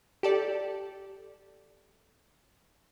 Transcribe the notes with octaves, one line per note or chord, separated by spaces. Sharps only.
G4 A4 D5